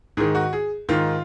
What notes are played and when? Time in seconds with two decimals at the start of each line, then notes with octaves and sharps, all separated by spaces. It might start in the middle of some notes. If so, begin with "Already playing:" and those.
0.17 G#2 D#3 G#4
0.35 F#4
0.53 G#4
0.89 G#2 D#3 F4